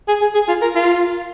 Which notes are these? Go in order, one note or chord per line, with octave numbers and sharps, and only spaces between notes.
G#4
G#4
G#4
F4
A#4
F4